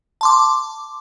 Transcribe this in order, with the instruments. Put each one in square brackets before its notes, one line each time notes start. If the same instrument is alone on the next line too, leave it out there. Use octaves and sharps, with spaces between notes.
[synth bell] A5 C6 D6